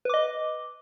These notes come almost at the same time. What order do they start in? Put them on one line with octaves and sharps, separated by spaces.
B4 D6 D#5